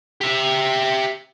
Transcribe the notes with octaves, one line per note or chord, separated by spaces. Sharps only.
G4 E5